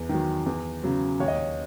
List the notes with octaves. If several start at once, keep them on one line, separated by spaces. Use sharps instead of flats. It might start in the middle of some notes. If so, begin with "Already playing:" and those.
Already playing: E2
D#3 F#3
E2
C#3 F#3
D#2 C#5
D#5
C#5